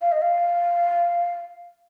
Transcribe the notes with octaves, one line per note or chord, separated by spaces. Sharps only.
F5
D#5
F5